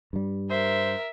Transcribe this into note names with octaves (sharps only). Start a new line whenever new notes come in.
G2 G3
A#4 C5 E5